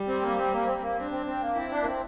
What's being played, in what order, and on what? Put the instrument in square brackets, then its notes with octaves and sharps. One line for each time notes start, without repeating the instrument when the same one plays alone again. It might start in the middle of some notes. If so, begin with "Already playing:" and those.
Already playing: [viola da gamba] G3
[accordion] C4
A#3
C4
A#3
C4
A#3
[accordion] C4 [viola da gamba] D4
[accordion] C4
C4
A#3
[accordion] C4 [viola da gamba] E4
[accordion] D4
A#3
C4